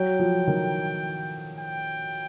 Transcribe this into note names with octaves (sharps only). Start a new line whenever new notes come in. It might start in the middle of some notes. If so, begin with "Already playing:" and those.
Already playing: F#3 G5
F3
D#3
G5